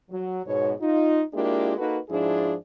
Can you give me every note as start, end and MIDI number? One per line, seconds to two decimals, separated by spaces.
0.11 0.41 54
0.47 0.72 44
0.47 0.72 47
0.47 0.72 73
0.81 1.22 63
0.81 1.22 65
1.34 1.73 56
1.34 1.73 58
1.34 1.73 62
1.34 1.73 64
1.34 1.73 65
1.34 1.73 67
1.78 1.97 58
1.78 1.97 63
1.78 1.97 66
1.78 1.97 69
1.78 1.97 71
2.09 2.54 44
2.09 2.54 53
2.09 2.54 62
2.09 2.54 64
2.09 2.54 65
2.09 2.54 68